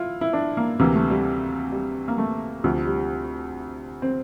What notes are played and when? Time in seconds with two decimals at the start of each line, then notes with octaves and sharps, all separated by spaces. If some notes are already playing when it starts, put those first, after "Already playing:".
Already playing: E4 F4
0.21 E4
0.33 D4
0.57 A#3
0.79 D2 C3 E3 A#3
0.95 A3
1.10 G3
1.72 G3
2.08 A#3
2.18 A3
2.64 D2 C3 F3
2.86 G3
4.02 C4